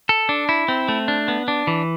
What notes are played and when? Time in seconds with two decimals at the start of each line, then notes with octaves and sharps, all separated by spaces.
0.09 A4
0.29 D4
0.49 E4
0.68 C4
0.89 A3
1.08 D4
1.28 B3
1.48 D4
1.67 E3